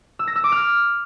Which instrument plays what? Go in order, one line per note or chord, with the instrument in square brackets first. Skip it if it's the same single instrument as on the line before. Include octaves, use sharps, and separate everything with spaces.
[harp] E6
A#6
E6
D6
F6